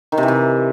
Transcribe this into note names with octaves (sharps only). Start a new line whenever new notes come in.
D#3
C3
E3
C3